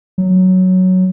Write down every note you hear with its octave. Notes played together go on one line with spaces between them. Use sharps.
F#3